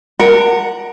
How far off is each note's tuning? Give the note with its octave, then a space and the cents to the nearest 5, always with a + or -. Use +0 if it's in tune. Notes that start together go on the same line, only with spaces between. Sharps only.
A#4 +15 F#5 +0 A#5 -45